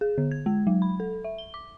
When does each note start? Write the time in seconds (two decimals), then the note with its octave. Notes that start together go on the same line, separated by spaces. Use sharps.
0.01 G#4
0.18 D3
0.31 G#6
0.46 G#3
0.67 F#3
0.82 B5
1.00 A4
1.24 E5
1.38 G7
1.54 D6